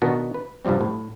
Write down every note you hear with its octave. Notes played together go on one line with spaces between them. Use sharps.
B2 D#3 B3 D4 F#4 A#4
B4
G2 C3 F3 G3 C4
A2